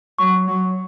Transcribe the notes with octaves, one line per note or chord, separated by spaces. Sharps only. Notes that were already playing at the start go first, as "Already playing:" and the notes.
F#3 C#6
F#3